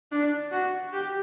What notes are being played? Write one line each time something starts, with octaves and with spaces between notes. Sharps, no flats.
D4
F#4
G4